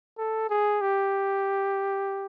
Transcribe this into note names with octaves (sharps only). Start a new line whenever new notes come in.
A4
G#4
G4